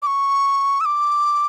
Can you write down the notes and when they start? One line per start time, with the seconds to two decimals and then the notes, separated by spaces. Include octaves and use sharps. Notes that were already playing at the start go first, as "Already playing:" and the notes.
0.02 D6
0.07 C#6
0.81 E6
0.85 D6